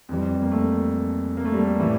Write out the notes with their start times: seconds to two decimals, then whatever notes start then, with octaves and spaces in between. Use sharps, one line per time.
0.09 F2 E3 G3
0.42 A#3
0.52 A3
1.37 A#3
1.45 A3
1.53 G3
1.62 A3
1.79 A2 E3 G3